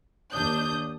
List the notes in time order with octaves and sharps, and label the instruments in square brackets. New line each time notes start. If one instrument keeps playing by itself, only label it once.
[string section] D#2 D4 G6 [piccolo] D#6